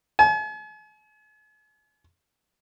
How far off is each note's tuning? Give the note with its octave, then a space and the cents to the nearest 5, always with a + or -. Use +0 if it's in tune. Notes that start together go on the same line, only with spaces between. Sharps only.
G#5 +45